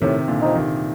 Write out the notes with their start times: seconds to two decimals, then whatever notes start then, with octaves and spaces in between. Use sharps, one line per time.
0.01 A2 C3 D#3
0.28 A#2 D3
0.42 F3 C4 D#4
0.55 C3 D#3